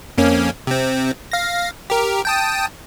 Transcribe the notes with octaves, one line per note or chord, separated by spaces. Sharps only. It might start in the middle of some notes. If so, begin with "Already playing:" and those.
F2 A#3 C#4
C3 C4
F5 A#6
G4 A#4
G5 A5 D#6